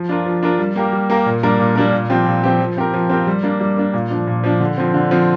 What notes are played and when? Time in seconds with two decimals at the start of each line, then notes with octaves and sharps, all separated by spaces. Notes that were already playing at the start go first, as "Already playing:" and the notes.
Already playing: F3
0.09 D4 F4 A#4
0.26 F3
0.43 D4 F4 A#4
0.59 G3
0.76 A#3 G4 A#4
0.92 G3
1.10 A#3 G4 A#4
1.26 A#2
1.43 G3 A#3 D4 A#4
1.59 A#2
1.76 G3 A#3 D4 A#4
1.92 A#2
2.10 F3 C4 G4
2.26 A#2
2.43 F3 C4 G4
2.60 F3
2.77 C4 G4 A#4
2.94 F3
3.10 C4 G4 A#4
3.27 G3
3.43 A#3 D4
3.60 G3
3.77 A#3 D4
3.94 A#2
4.10 F3 D4
4.27 A#2
4.44 F3 D4
4.60 D3
4.77 F3 C4
4.94 D3
5.11 F3 C4